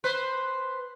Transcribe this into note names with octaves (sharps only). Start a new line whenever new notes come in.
B4 C5